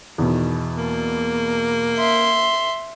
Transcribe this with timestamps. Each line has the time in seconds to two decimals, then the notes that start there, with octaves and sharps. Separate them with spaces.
0.18 E2 B2 D#3
0.78 A#3
1.97 E5 C6